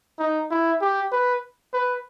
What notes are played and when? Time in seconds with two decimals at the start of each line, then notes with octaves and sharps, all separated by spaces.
0.19 D#4
0.51 E4
0.81 G4
1.12 B4
1.73 B4